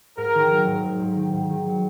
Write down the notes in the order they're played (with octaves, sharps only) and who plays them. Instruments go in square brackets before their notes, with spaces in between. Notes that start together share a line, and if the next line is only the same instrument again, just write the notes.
[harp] G#2 [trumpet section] A#4
[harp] D#3
F#3
G#2
G#2
G#2
D#3
G#2
D#3
F#3